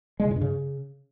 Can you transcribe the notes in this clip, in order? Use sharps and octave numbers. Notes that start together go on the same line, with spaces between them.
G#3
C#3
A2
G2
C#3